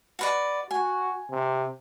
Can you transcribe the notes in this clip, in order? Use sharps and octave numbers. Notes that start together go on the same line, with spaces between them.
F#4 B4 D5
F#4 G#5
C3